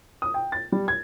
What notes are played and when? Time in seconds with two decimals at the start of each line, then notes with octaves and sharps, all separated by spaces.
0.22 D#6
0.34 G5
0.52 A6
0.72 G3
0.88 G#6